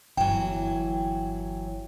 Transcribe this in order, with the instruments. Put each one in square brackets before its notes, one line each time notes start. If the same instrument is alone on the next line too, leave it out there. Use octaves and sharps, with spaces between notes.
[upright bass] G1 [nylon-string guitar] E3 F#3 [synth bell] G5